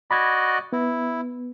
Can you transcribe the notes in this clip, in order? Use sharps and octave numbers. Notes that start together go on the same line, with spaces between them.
F#4 D5 D#5 B5 G#6
B3 E4